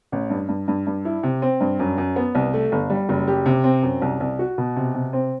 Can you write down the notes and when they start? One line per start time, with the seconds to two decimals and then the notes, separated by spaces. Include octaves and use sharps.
0.12 A1
0.30 G2
0.49 G2
0.68 G2
0.87 G2
1.05 E4
1.23 C3
1.42 C4
1.61 G2
1.79 F#2
1.98 F#2
2.16 B3
2.35 C2
2.54 A3
2.72 G1
2.90 G3
3.09 F#1
3.28 G4
3.46 C3
3.64 C4
3.83 F#2
4.02 C2
4.20 C2
4.39 F#4
4.58 B2
4.76 C3
4.95 C3
5.13 C4